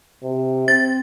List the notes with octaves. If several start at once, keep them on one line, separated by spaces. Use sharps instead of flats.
C3
C4 A6